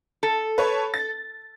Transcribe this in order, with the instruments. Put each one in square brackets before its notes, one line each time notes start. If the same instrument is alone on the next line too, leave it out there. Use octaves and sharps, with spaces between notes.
[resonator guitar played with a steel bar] A4
[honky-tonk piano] B4 C#5 A5
A6